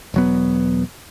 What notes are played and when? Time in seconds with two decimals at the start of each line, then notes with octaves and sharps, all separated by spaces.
0.14 E1 F#3 B3